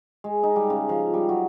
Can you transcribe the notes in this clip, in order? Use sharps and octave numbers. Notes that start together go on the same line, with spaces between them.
G#3
D#4
G3
C#3
F3
G3
F#3